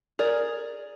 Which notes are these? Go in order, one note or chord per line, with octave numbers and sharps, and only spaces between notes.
G#4 A#4 D5